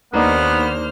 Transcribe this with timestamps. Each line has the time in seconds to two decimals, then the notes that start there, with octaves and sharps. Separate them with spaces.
0.13 D#2 A#3 B3 D4 D#4 C5 F6